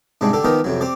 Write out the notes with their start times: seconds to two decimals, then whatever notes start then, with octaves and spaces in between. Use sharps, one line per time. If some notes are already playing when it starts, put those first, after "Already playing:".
0.21 G#2 C3 G3 G#3 D4
0.33 D3 D4 G4 A4
0.44 D#3 F3 B3 D#4 G4 A#4
0.64 F2 C3 F#3
0.81 C4 G4 D5